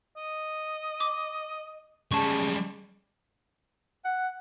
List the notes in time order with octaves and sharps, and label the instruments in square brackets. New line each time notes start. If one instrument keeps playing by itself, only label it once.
[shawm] D#5
[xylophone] D6
[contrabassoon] C#3 [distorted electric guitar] G3 G#3 [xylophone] A5 C#6
[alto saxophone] F#5